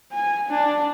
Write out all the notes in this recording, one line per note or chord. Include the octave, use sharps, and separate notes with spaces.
G#5
D4